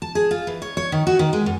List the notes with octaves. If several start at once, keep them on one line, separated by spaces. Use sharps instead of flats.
A5
G#4
F4
E3
C#5
C#5
D#3
F#4
D#3
G#3
F#2